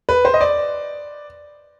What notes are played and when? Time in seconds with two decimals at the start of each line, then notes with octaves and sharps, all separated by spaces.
0.09 B4
0.25 C5
0.34 D#5
0.41 D5